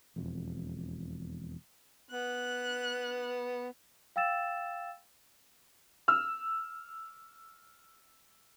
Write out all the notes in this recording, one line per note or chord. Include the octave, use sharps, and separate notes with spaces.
E1 F2
B3 F#6
F5 G5 E6 A6 E7
E6 F6